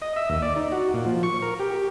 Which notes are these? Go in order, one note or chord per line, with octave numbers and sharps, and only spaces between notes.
D#5
E5
D#2
D5
D#4
F#4
A#2
F3
C#6
A#4
G4
G4